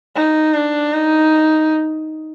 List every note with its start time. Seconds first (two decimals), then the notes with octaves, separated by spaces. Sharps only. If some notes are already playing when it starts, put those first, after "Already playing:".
0.16 D#4
0.54 D4
0.93 D#4